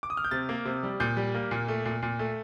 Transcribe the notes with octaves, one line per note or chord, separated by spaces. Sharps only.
D6
D#6
F6
G6
C3 A6
A#3
C3
G3
A#2 G6
G3
A#3
A#2
A3
A#2
A#2
A3